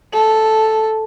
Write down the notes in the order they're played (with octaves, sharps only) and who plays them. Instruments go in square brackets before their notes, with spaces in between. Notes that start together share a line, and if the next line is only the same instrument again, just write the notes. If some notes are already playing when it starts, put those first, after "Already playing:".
[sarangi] A4